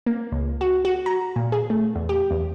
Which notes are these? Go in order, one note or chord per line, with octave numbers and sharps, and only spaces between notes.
A#3
C#2
F#4
F#4
A#5
A#2
G#4
A3
E2
G4
E2